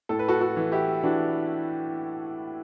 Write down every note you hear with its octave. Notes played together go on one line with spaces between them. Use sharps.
A2 A4
B4
F#4 A4
F#4 A4
E3
E4 G4
E3 D4 F#4